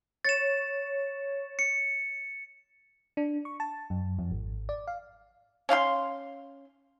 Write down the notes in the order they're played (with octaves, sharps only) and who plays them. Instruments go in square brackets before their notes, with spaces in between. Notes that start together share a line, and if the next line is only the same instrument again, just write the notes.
[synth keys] C#5 [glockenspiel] A6 E7
[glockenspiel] C#7
[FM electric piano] D4
C#6
A5
F#2
F2
G#1
D5
F5
[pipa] C#4 F5 G5 C6